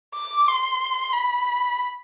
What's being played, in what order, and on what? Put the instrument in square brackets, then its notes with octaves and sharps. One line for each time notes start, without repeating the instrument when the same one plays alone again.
[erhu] D6
C6
B5